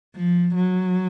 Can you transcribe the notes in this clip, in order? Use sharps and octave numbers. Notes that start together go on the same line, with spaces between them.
F3
F#3